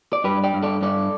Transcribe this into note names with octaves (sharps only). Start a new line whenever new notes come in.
D5
G2 G4 B4
D5 G5
G2
A4 D5
G2 A4 D5